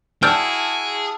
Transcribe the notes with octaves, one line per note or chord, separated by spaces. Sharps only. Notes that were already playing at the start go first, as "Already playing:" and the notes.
E4 F#4 G#4 D5 G5 A5 E6 F6